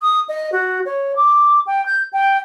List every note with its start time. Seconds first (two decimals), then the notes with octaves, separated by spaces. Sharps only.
0.01 D#6
0.28 D#5
0.52 F#4
0.85 C#5
1.16 D6
1.66 G5
1.85 G6
2.12 G5